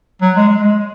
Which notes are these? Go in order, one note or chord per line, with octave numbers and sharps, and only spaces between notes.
F#3
G#3
G#3
G#3